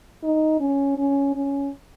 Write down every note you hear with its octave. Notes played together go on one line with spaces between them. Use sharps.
D#4
C#4
C#4
C#4